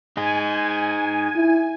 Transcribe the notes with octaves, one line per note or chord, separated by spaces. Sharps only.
D#4 G#4 G#5
E4